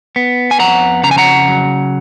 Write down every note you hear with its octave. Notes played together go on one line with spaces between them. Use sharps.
B3
G#5
F2 F#5 A#5
C#3 A#5
G#5
F#5 A#5
F#3